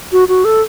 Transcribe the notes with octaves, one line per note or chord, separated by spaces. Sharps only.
F#4
F#4
A4